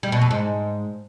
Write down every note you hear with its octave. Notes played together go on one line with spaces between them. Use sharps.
G3
B2
F2
G#2